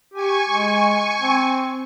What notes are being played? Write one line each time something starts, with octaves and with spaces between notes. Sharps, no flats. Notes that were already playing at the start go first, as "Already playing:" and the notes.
G4 G#5 C#6
G#3
C4